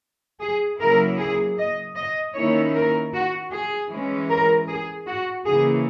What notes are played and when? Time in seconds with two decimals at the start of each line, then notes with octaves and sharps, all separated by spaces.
0.41 G#4
0.79 C#3 F#3 A#3 E4 A#4
1.18 G#4
1.57 D#5
1.96 D#5
2.34 D#3 A#3 C#4 E4 C#5
2.74 A#4
3.12 F#4
3.51 G#4
3.90 E3 G#3 C#4
4.28 A#4
4.68 G#4
5.06 F#4
5.45 C#3 E3 A#3 G#4